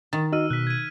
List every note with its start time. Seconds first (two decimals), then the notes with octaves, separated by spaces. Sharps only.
0.13 D#3 A6
0.33 D#4 F#4 D#5 E6 F6 D#7
0.50 B2 F#6 B6
0.67 G#6 D#7